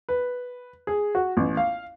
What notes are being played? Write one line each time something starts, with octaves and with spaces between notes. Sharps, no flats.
B4
G#4
F#4
A1
F5